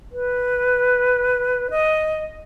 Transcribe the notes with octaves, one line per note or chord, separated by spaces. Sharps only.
B4
D#5